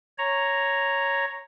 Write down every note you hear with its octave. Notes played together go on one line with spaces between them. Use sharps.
C#5 A#5